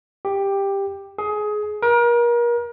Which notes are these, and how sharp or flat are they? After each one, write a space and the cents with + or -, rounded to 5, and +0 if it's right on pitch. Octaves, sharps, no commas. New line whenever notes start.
G4 +10
G#4 +20
A#4 +35